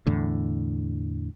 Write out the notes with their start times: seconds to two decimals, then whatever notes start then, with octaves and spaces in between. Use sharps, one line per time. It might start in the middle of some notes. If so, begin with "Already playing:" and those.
0.07 E2 A2 D3